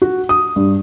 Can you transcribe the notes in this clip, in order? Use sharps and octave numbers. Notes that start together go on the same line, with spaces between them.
F#4
D#6
G2